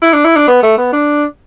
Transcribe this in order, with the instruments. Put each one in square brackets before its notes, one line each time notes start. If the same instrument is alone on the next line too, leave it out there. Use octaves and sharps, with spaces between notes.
[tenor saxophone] E4
D4
E4
D4
B3
A3
B3
D4